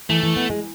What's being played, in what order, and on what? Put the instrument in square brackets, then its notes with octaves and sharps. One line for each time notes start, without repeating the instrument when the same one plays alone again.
[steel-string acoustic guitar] E3 [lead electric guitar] A3
[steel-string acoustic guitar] E3
B3
G#3